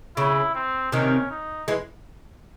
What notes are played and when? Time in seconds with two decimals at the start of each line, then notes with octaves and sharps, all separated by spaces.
0.17 C#3 E4
0.55 C4
0.92 C3 D#3 C#4
1.31 D#4
1.68 E3 G#3